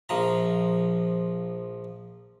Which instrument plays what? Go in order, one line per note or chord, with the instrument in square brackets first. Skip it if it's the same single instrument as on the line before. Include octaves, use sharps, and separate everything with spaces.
[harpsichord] A#1 F3 A#5